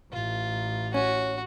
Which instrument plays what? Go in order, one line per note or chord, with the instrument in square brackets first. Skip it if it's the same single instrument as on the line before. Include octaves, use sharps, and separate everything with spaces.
[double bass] A1 [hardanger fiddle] F4
[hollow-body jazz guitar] C#4 [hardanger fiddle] F#4